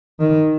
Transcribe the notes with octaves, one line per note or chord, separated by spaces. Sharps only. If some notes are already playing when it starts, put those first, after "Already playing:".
D#3